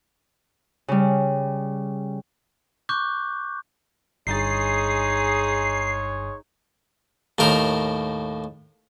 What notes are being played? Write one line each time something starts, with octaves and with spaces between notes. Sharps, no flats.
C#3 G3
C#6 D6 F#6 G6
G1 G2 G#3 D#4 G#4 C#5 A6 C7
D#2 A2 A#4 C5